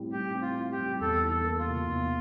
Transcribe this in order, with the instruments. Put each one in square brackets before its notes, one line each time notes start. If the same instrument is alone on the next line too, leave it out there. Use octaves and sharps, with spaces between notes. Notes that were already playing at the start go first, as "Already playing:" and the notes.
Already playing: [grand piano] A2 G3 C4 E4
[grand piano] A2 [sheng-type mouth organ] G4
[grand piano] C4
[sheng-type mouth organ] F4
[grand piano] E4
[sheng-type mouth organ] G4
[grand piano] G3
[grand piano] E2 [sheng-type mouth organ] A4
[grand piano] E3
[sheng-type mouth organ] A4
[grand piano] A#3
[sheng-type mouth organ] F4
[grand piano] C3
E2